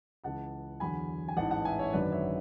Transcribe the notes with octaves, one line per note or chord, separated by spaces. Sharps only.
C#2 C#3 E3 F#5 A5
E2 D3 F#3 G#5 B5
G#5
A1 G#2 E3 F#5 A5
F#5 A5
E5 G#5
C#5 E5
G#1 F#2 D3 F#3 B4 D5
C#5 E5